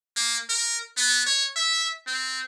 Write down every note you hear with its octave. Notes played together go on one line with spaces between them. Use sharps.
A#3
A#4
B3
C#5
E5
C4